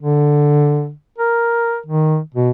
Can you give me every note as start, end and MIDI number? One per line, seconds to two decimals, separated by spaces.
0.01 0.91 50
1.18 1.78 70
1.86 2.19 51
2.35 2.50 47